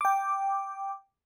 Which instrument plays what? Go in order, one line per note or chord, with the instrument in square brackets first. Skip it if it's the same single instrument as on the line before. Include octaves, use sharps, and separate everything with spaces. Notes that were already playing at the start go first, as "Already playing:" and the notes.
[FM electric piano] G5 D6